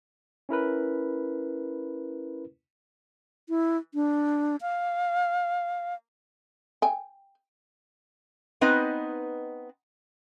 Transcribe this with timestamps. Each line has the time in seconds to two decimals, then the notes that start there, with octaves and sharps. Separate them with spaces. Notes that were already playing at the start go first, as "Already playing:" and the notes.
0.49 C#4 E4 A#4 B4
3.49 E4
3.94 D4
4.61 F5
6.82 G5 G#5
8.61 B3 C4 D#4 B4 D#5